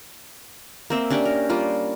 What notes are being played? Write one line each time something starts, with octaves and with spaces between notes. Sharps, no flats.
A#3 C4 E5
C#4 D4 G4 D5
A#4
G3 A#3 F4